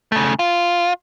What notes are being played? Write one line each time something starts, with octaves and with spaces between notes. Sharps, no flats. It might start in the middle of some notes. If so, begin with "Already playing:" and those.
C#3 A3
F4